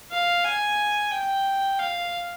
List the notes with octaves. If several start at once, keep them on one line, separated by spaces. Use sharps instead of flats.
F5
G#5
G5
F5